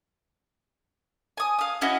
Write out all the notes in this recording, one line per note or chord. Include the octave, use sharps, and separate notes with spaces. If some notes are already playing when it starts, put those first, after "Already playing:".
G#5 D#6
F5 D#6
C#4 E4 F#4 D#5